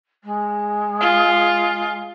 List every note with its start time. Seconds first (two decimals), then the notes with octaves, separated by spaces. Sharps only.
0.24 G#3
1.01 F4